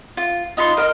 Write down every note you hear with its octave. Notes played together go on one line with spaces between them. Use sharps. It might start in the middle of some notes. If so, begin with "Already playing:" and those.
F4
D#4 F4 B5 C6
A#4 D#5 F6